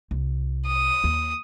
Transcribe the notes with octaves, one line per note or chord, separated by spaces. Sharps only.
C2
D#6
D#2